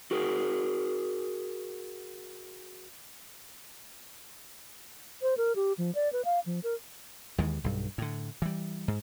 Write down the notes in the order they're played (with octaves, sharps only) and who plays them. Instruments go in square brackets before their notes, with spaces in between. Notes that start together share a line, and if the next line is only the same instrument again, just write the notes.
[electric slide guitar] F#4 G#4 A#4
[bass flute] C5
A#4
G4
F3
D5
B4
F5
F3
A#4
[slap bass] D#2 D#3 E3 G#3
B1 G2
A2 D3
E3 G3
G#2